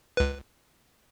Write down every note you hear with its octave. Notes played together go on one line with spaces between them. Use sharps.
C#2 B4